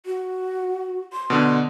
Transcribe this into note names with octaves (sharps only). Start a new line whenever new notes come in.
F#4
C6
B2 D3